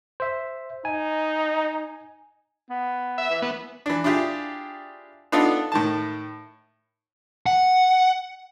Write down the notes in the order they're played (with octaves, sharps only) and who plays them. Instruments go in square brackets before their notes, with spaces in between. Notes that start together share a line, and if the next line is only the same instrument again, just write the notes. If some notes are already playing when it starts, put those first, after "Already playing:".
[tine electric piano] C5 E5
[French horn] D#4 [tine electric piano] G#5
[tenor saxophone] B3
[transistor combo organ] E5
[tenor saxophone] E3
[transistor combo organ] B3
[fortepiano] E3 D4
D4 E4 F4 G4 G#4
B3 D4 D#4 F4 A4
A2 D#3 A5
[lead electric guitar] F#5